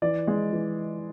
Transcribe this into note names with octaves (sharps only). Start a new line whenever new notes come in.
E3 D5
G#3
E3